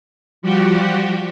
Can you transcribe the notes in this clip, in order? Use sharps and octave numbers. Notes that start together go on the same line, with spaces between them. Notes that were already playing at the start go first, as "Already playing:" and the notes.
F3 G3 F#4 G4